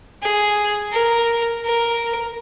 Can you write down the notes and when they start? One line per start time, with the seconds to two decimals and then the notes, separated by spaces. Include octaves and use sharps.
0.22 G#4
0.93 A#4
1.64 A#4